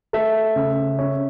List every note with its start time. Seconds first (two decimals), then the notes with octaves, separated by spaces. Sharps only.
0.13 A3 E5
0.56 C#3
0.99 C#4